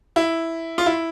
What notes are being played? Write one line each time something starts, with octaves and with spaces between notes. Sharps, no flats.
E4
F4
E4